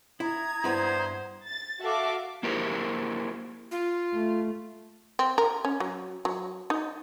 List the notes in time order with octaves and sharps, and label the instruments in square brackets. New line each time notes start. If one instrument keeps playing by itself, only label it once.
[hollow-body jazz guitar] E4 [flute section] A#5 D#6 G#6
[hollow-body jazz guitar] G2 B3 E4 [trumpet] C5
[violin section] A6
F#4 A4 E5 F5 D6
[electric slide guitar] A#3 E4 G4 G#4 A#4 C5
[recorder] F4
[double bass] A3
[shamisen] C4
A#4
C#4
F#3
F#3
D#4